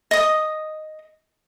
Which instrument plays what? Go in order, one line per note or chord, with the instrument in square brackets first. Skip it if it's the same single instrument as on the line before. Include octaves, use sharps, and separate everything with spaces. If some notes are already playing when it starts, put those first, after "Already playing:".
[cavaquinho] D#5 D#6